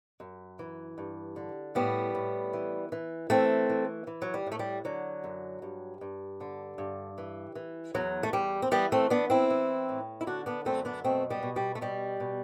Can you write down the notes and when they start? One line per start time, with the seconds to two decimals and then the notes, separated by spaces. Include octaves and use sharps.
0.20 F#2
0.59 E3
0.98 G2
1.36 D3
1.75 A2 G3 B3
2.15 A2
2.53 E3
2.92 E3
3.30 E3 A3 C4
3.70 E3
4.07 E3
4.22 F#3
4.34 G3
4.46 A2
4.52 A3
4.59 G3
4.85 D3 F#3
5.24 F#2
5.62 G2
6.01 G2
6.41 D3
6.78 G2
7.18 E3
7.55 E3
7.94 E2 F#3
8.23 A3
8.33 E2 G3
8.62 C4
8.71 E3 G3 B3
8.92 A3 C4
9.10 E3 B3 D4
9.30 C4 E4
9.50 E3
9.89 A2
10.21 E4
10.27 D3 D4 F#4
10.46 B3 D4
10.65 F#2 A3 C4
10.85 B3 D4
11.04 B2 A3 C4
11.30 G3 B3
11.43 B2
11.56 G3
11.75 A3
11.81 B2 G3
12.20 B2